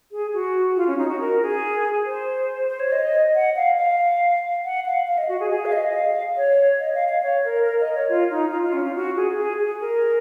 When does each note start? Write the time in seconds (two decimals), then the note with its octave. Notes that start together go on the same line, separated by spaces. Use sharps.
0.12 G#4
0.34 F#4
0.76 F4
0.87 C#4
0.98 D#4
1.09 F#4
1.20 A#4
1.42 G#4
2.06 C5
2.68 C5
2.80 C#5
2.92 D#5
3.35 F#5
3.56 F5
3.78 F5
4.65 F#5
4.86 F5
5.07 F5
5.18 D#5
5.29 F#4
5.40 G#4
5.50 G#4
5.66 F5
5.72 D#5
5.93 F5
6.37 C#5
6.80 D#5
6.95 F5
7.09 F5
7.23 C#5
7.44 A#4
7.65 A#4
7.80 D#5
7.94 C#5
8.09 F4
8.31 D#4
8.52 F4
8.62 F4
8.73 C#4
8.85 F4
8.96 F#4
9.17 G#4
9.38 G#4
9.60 G#4
9.81 A#4